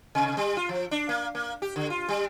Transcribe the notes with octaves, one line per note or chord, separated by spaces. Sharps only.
C3
G3
F4
F3
D4
A#3
A#3
G4
D3
F4
G3